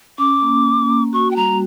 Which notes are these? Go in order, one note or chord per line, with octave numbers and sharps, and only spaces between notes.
C#4 D6
A#3
A#3
A#3
F#4 C#6
G5
G3 A#5